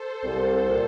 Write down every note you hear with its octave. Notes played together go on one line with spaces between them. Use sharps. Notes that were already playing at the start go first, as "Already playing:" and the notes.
Already playing: A4 C5
C2
A#2